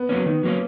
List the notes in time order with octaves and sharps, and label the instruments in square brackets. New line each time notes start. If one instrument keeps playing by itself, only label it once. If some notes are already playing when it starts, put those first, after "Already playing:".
Already playing: [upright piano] B3
[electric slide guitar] F#3 A#3 C#4
D#3
F#3 A#3 C#4